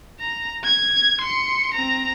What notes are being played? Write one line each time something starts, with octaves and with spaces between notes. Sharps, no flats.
A#5
G#6
C6 C#7
C4 A#5